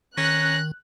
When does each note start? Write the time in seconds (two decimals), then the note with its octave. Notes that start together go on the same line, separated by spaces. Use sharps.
0.18 D#3 C#4 A#5 F#6